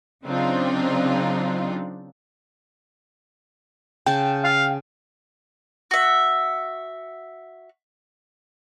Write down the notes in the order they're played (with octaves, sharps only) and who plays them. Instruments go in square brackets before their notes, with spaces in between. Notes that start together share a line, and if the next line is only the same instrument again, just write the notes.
[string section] C#3 F#3 C4 D4 D#4 F4
[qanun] C#3 A5 [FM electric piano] G5
[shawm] F5
[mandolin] F#4 E5